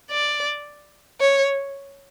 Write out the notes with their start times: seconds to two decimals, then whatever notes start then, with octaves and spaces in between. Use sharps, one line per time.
0.11 D5
1.21 C#5